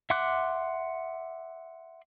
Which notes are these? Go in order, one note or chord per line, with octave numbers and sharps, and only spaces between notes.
E5 F#5 C6 D6 F#6